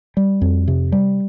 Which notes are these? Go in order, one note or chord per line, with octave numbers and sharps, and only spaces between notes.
G3
F2
C3
G3